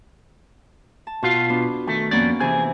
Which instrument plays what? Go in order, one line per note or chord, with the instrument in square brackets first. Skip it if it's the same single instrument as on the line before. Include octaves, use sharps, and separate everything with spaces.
[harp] A5
[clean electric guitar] B2 F4 F5 [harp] F#4
[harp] B3 D4
[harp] D#3 [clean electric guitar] A3
[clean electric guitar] F2 D5 [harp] A#3 B3 C#4
[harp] C3 E3 [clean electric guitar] G#4